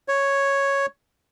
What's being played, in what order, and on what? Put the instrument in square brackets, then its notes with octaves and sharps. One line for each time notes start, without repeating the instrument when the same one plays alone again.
[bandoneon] C#5